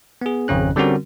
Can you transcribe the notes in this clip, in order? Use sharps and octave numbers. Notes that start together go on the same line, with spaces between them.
B3 G#4
G#1 F2 C#3 C#4 F#6
D3 G3 C4 C#4 F#4 A#4